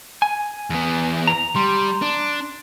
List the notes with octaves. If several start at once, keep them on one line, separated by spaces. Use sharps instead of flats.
G#5
E2 B3
A#5
G3 C6
D4